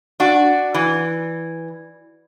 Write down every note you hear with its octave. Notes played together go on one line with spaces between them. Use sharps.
D4 F#4
E3